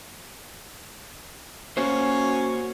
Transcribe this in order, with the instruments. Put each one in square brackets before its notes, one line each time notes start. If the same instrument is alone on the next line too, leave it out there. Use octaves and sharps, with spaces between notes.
[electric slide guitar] A#3 F#4 C5 [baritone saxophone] C#4